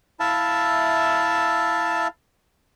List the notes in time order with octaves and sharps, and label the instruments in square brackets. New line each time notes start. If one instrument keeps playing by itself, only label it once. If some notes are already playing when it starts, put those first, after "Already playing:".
[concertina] E4 E5 F5 A5